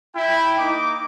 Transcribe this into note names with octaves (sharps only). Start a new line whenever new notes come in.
E4 G5
A#3 D#4 D6